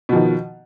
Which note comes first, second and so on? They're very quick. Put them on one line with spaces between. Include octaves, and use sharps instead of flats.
B2 F3 D#3